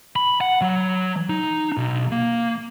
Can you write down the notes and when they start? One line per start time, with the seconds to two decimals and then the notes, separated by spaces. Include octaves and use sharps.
0.16 B5
0.41 F#5
0.61 F#3
1.29 D#4
1.77 B1
2.12 A#3